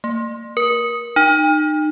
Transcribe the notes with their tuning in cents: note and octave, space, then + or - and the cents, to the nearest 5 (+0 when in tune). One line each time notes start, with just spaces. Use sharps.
A#3 -35
A#4 +30
D#4 -30